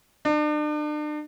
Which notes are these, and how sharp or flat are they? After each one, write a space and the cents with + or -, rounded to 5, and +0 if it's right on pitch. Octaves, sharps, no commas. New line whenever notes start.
D4 +40